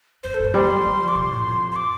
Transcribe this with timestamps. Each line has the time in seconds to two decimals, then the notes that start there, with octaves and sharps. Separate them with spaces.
0.24 F2 C5
0.34 A4
0.40 G2 C5
0.54 G3 C6
0.85 G3
1.01 F3
1.08 D6
1.15 C3 C6
1.31 A2
1.46 F2
1.72 C6
1.76 D6